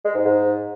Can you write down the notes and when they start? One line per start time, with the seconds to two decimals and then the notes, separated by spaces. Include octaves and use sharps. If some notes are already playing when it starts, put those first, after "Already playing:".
0.05 G#3
0.15 G#2
0.25 G#2